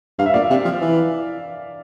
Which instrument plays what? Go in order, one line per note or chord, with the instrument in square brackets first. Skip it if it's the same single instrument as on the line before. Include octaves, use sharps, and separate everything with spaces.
[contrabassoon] G2 [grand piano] F5
[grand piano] E5
[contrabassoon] A#2 [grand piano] D5 F5
[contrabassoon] C3
F3
E3